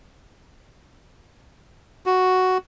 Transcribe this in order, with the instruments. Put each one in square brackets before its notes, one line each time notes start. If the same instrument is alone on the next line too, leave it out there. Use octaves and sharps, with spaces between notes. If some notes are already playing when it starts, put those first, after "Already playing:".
[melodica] F#4